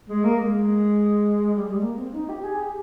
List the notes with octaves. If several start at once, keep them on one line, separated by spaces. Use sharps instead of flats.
G#3
A#3
G#3
G3
G#3
A#3
C4
D#4
G4
G#4
G4